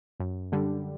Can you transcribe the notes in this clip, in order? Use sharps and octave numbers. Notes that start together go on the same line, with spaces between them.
F#2
D3 G3